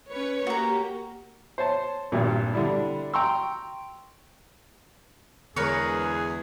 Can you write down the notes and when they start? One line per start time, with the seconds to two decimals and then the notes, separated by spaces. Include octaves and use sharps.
0.11 C#4 B4 C#5
0.47 A#3 F#4 G4 A#5
1.58 C5 C#5 A5
2.12 G#1 G2 A#2
2.54 D3 G3 D4 E4
3.14 G5 A#5 C6 C#6 E6
5.56 E2 D3 G#3 G#4 A#4 B4 C#5